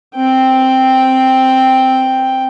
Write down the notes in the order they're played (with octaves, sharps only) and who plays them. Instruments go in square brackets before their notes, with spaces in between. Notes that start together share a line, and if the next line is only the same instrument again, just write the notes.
[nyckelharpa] C4 G5